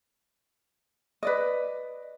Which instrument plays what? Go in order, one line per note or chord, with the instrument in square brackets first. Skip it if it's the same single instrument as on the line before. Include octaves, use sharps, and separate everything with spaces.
[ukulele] B4 D5 D#5